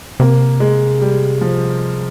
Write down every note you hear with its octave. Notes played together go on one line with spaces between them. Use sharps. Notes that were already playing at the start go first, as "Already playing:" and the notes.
C3 A#3
G#3
G3
F3